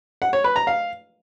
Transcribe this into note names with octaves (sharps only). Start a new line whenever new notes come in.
F#5
C#5
B4
A#5
F5